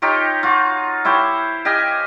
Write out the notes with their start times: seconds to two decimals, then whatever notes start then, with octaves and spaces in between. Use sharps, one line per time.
0.02 D#4 F4 G4 C#5
0.43 F4 F#4
1.05 E4 G4 C5 C#5
1.65 G4 D#5 F5 G#5